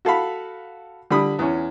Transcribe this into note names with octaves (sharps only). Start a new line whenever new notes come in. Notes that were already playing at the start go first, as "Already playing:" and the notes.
F#4 A4 F5 B5
D3 G3 B5 D#6
E2 C#4